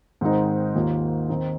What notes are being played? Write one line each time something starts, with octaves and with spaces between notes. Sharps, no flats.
G#2 D#3 C4 D#4
D#2 D#3 A#3 F4
D#3 C4 D#4